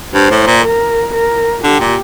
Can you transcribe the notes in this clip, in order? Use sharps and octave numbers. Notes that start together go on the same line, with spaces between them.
G2 C5
A2
A#2
A#4
A#4
D3 G4
A#2